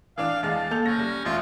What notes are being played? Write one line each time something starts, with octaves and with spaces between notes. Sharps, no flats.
E3 D4 F5 D6
E2 G#3 F5 A5
A#3 A4 G6 F7
F#1 C#4 A#6
G3
E1 A#1 F4 E5